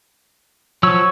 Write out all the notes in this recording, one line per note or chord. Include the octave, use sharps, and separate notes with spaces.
F3 F#3 C#5 E6